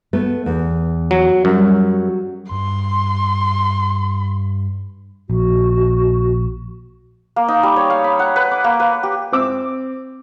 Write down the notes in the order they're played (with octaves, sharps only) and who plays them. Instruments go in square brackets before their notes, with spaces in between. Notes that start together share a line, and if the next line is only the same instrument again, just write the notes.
[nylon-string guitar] A3 B3
E2
[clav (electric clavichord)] F#3
[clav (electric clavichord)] F#2 [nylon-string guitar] F#3 G3
[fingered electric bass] G2 [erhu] C6
[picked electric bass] A#1 [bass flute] F#4
[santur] A#3
D#4
G3
C#5
F5
B5
F#5
B4
D6
A#3
B4
G4
[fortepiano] C4 D6 E6